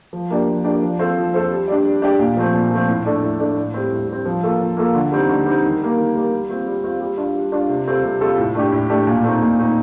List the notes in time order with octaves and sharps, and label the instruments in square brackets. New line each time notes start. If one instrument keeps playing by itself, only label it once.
[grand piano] F3
A#3 D4 G4 D5
F3
A#3 D4 G4 D5
F3
C4 F4 A4 C5
F3
C4 F4 A4 C5
G3
D4 G4 D5
G3
D4 G4 D5
A#2
F3 A3 C4
A#2
F3 A3 C4
A2
A3 D4 A4 D5
A2
A3 D4 A4 D5
A2
G3 C4
A2
G3 C4
F3
A#3 F4 A4
F3
A#3 F4 A4
D3
G3 C4 D#4
D3
G3 C4 D#4
D#3
G3 A#3
D#3
G3 A#3
G3
C4 F4
G3
C4 F4
G3
D4 F4
G3
D4 F4
C3
G3 C4 F4 A4
C3
G3 C4 F4 A4
A2
A3 D4 G4
A2
A3 D4 G4
A#2
A3 C4 D#4
A#2
A3 C4 D#4